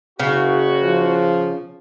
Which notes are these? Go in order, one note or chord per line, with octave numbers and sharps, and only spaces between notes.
F#1 C#3 F#4
F3